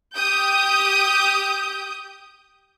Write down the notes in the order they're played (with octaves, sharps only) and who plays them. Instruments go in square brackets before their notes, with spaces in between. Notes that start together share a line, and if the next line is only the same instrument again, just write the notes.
[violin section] G4 D#6 G6